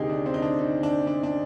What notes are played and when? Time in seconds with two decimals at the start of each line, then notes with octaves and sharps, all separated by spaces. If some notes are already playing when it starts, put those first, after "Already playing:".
Already playing: D2 C3 D#3 D#4 G4 G#4
0.09 D4
0.26 C4
0.34 D#4
0.42 D4
0.59 D#4
0.83 D4
1.07 D4
1.23 D4